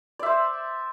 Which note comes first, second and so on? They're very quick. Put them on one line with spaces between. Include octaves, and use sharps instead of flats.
D5 E5 C5